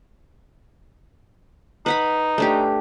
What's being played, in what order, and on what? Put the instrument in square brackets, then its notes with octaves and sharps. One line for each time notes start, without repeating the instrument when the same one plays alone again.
[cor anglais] D#4 [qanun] B4 F#5 B5
[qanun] A3 D4 G4